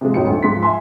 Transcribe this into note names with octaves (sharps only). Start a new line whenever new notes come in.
C3 F3 G#3
E1 A#1 F2 F#3 D#4 C#7
D2
G#2 F3 C6 B6
E5 G#5 C6